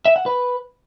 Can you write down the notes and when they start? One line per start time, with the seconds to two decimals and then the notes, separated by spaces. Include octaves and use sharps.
0.06 E5
0.16 F#5
0.26 B4